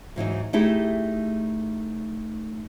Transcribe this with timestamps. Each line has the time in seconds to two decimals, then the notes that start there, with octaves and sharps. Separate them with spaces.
0.16 G#2 E3 F#3 D#4
0.53 A3 D#4 E4 G4 G#4